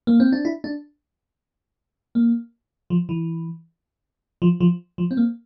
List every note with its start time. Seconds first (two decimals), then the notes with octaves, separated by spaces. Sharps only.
0.07 A#3
0.20 C4
0.32 D4
0.45 E4
0.64 D4
2.15 A#3
2.90 F3
3.09 E3
4.42 F3
4.60 F3
4.98 F3
5.11 C4
5.17 A#3